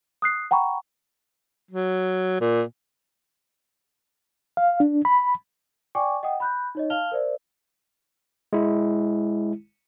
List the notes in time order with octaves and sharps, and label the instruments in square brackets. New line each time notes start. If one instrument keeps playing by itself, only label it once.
[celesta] D#6 F#6 C7
F#5 G5 A#5 B5 C#6
[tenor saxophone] F#3
A#2
[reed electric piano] F5
D4
B5
[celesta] D5 G5 G#5 C#6 D6
D#5 F#5 G5 D#6
B5 F#6 G6
D#4 C#5 D#5
F5 A5 F6 F7 G7
A#4 C5 D5 E5
[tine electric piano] G#3 E4